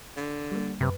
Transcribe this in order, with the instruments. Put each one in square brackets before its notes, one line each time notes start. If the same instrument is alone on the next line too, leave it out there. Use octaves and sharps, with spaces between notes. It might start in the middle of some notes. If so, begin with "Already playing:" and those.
[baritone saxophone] D3
[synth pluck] G3 A#3
[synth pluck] F#2 B4 [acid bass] C3